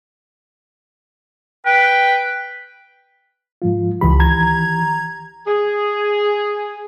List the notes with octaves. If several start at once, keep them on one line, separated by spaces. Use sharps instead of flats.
B4 G5
G#2 F3 F4
C#2 D#3 E3 G4 B5
A#5 G#6
G#4